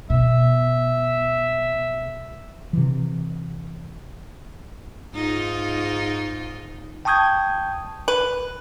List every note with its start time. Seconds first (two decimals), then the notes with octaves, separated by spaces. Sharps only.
0.10 B2 E5
2.73 C3 E3
5.14 G#2 D#4 F4
7.05 G5 A5 C#6 D#6 G6 G#6
8.08 B4